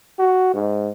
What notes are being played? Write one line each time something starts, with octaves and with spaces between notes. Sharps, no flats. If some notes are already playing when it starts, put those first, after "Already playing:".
F#4
G#2